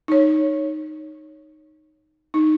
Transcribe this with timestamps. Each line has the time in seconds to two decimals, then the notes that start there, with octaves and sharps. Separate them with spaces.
0.08 D#4 C#5
2.34 D#4